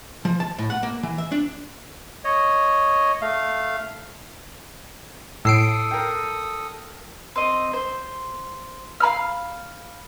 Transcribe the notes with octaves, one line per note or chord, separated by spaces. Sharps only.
F3
A5
A2
F#5
A#3
E3
E5
D4
C#5 D#5
A3 F5
A2 A4 D#6 E6 C7 D7
A#4 G5
C4 D#5
C5
F5 A#5 B5 F6